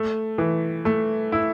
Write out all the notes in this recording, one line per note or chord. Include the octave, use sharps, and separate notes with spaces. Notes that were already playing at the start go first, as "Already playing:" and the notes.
Already playing: A3
E3
A3
E4